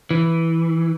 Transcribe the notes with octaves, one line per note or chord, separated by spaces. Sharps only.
E3